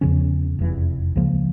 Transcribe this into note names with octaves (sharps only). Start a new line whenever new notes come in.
E2 C#3 F3 C#4
F1 E2 E3
C#2 C#3 F3 A#3